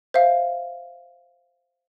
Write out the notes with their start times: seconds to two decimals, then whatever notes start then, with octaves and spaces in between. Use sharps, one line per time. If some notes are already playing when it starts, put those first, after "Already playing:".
0.14 C5 E5 F5